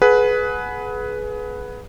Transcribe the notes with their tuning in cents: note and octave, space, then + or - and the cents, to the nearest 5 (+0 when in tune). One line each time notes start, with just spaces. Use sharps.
G#4 +25 B4 +0 F#5 -10